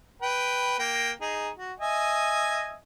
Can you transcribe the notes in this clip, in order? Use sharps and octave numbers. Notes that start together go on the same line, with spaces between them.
B4 G5
A#3 G5
D#4 G#4
F#4
D#5 E5 G#5